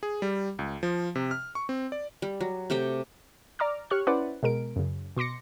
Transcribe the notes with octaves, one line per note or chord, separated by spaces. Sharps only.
G#4
G3
C#2
F3
C3
F6
C#6
C4
D5
G3
F#3
C3 A3 G4 G5
D5 A#5 D6 F6
G4 C#5 C#6 F6 F#6
C#4 E4 B4 C5 D5 F#5
B2 G#3 A#4 D7
F#2 C#3
B2 C6 D6 A#6 C#7